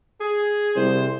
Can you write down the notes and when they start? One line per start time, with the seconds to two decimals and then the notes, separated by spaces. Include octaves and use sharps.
0.21 G#4
0.76 C2 C5